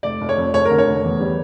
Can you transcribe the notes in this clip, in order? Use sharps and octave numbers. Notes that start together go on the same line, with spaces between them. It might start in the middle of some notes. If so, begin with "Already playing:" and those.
F1 D5
F1
C#5
F2
F1 C#5
A#4
D3
C#5
F1
E2
G3